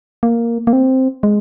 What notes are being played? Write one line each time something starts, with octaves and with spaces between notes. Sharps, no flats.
A#3
A#3
C4
G#3